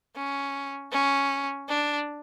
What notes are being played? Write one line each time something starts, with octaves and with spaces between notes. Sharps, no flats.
C#4
C#4
D4